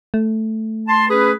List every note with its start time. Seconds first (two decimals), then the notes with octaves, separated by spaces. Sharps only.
0.14 A3
0.87 A5 C6
1.10 C#4 G#4 B4